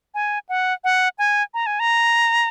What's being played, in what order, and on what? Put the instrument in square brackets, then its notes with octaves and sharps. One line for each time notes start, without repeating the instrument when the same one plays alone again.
[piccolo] G#5
F#5
F#5
G#5
A#5
G#5
A#5